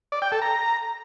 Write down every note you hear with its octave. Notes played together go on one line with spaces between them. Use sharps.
D5
G5
A4
A#5